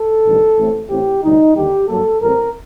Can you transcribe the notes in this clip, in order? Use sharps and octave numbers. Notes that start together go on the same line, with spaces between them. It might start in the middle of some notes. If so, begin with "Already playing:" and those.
Already playing: A4
A1 G2 D#3
A1 A2 A3 C4
A1 A2 A3 C4 G4
D2 C3 G3 D#4
D#2 D3 G3 G4
G2 F#3 A#3 A4
A1 A2 G3 C4 A#4